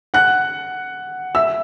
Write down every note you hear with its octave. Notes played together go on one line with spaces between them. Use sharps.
F#5 F#6
E5 E6